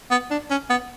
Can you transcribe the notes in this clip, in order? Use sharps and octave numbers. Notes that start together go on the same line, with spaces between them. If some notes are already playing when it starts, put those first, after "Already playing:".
B3
D4
C#4
B3